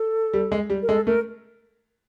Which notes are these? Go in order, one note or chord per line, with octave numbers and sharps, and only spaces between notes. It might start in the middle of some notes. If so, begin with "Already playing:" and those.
Already playing: A4
G3
G#3
G3
A#4
G#3 A4
A3 A#4